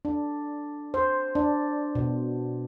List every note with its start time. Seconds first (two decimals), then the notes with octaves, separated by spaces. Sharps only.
0.05 D4
0.94 C5
1.35 D4
1.95 B2